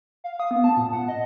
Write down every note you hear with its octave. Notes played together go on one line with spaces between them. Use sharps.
F5
D#6
B3
A5
A#2
F#5
D#5